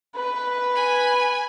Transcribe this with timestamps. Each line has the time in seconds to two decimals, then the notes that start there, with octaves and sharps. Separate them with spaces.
0.15 B4
0.75 G#5 B5